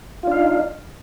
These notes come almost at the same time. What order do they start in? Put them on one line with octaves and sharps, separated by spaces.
F4 D4 F5 D#4